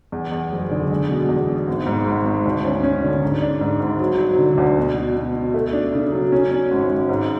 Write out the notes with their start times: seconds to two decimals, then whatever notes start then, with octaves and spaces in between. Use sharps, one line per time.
0.12 E2
0.32 E2
0.52 F#1
0.71 D3
0.91 G#3
1.10 B2
1.29 E2
1.48 B2
1.67 G#1
1.86 G#2
2.06 G#1
2.25 G#1
2.46 D2
2.65 C#4
2.83 C#4
3.03 D3
3.22 G#2
3.42 D4
3.61 G#2
3.80 G#1
4.00 F#3
4.19 F#3
4.39 D3
4.58 D2
4.78 B2
4.96 B2
5.16 B2
5.36 B2
5.54 A3
5.73 D4
5.93 C#3
6.12 F#3
6.32 C#4
6.52 C#4
6.71 G#1
6.90 G#1
7.09 G#2